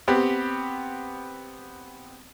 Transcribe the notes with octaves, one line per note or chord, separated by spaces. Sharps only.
B3 C4 G4